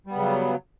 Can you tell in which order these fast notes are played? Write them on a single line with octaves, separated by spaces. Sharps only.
G3 B3 C#3 F#3